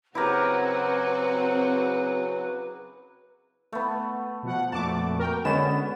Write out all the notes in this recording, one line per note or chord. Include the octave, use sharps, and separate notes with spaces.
C#3 F#3 C4 E4 F#4 G4 A#4 B4
A3 B3
B2 F3 F#5
F2 A#2 A3 F#4 A5 D6
A#4 G5
D3 G#3 B3 C#4 E7